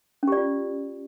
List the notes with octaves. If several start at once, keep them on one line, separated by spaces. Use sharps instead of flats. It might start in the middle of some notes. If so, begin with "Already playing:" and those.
C#4 F4 G4 D5